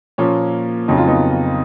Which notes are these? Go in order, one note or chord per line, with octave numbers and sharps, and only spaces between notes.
A#2 F3 A#3 C#4
F2 C#3 F#3 D#4
F4
B3 D#4